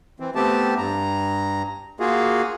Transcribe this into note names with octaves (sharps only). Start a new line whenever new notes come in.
E3 C4
A3 B3 C4 G4 A5
G2 A#5
A#3 F4 F#4 G#4